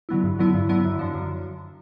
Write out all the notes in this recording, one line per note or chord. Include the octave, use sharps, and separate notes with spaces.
D3 F#3 B3 E4
G2
D3 F#3 B3 E4
G2
D3 F#3 B3 E4
F#2
D3 F3
F#2